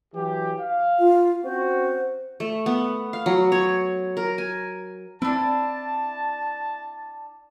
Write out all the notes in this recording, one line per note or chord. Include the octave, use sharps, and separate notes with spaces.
E3 F#3 G4
F5
F4
C4 C#4 F#4 C5
A3
B3
F5
F#3
C#5
A#4
G#5
C4 D4 E4 A5